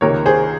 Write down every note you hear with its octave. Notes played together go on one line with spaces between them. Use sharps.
C#2 C3 D#3 A#3 A#4 C#5
G#4 C5